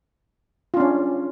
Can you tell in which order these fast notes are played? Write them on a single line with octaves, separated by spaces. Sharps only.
F4 D4 C#4